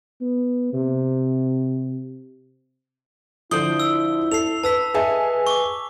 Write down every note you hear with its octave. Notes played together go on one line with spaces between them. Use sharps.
B3
C3
D3 F3 E4 C5 D5 D#6 G7
E6
A4 C7 F7
B4 A5 E6 B6
G#4 A4 B4 D#5 E5 G#5
C#6 D6